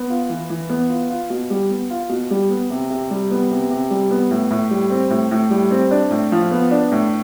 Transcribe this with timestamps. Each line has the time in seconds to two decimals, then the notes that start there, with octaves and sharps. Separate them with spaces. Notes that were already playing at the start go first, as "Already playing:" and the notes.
Already playing: B3
0.10 F4
0.29 E3
0.50 E3
0.70 B3
0.90 F4
1.09 F4
1.30 B2
1.50 G3
1.70 B3
1.90 F4
2.09 B2
2.31 G3
2.50 B3
2.70 C3
2.90 C3
3.10 G3
3.31 B3
3.51 C3
3.70 C3
3.90 G3
4.11 B3
4.31 A2
4.50 A2
4.71 G3
4.90 C4
5.10 A2
5.31 A2
5.50 G3
5.71 C4
5.91 D4
6.11 A2
6.32 F3
6.51 B3
6.71 D4
6.92 A2